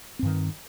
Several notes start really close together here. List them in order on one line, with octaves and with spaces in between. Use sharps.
C4 G2 D#3